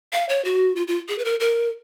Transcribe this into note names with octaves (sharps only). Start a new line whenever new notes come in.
F5
C#5
F#4
F4
F4
G#4
B4
A#4
A#4